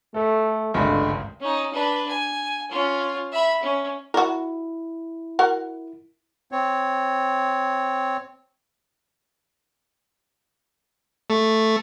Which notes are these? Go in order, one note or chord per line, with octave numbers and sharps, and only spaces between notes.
A3 A4
G#1 C#2 G2 D3 G#3 A3
C#4 D#4
D4 B4
G#5
C#4 F4
E5 B5
C#4
E4 F#4 A#4
F#4 A#4 F#5
C4 C#5
A3